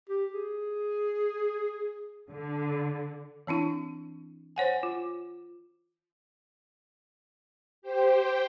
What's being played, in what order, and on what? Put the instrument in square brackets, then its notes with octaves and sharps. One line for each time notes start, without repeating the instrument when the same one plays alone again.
[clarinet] G4
G#4
[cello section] D3
[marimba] E3 C4 D4 E4
C5 C#5 F#5 G#5
F4
[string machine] G4 C5 G5